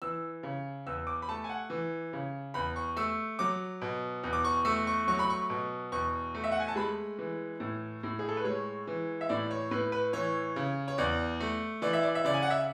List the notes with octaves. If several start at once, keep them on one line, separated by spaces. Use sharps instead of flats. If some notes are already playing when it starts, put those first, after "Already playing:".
E3 E6
C#3
E2 E6
D6
B5
A3 A5
G#5
F#5
E3
C#3
E2 B5
C#6
A3 E6
F#3 D6
B2
E2
D6
C#6
A3 E6
C#6
F#3 C#6
B5
C#6
B2
E2 C#6
A3
E5
F#5
G#5
A5
G#3 B5
E3
A2
A2
G#4
A4
B4
G#3 C#5
E3
E5
A2 D5
C#5
A2 B4
B4
E3 C#5
C#3
C#5
E2 D5
A3
E3 D5
E5
D5
E5
C#3 D5
G#5
F#5
E5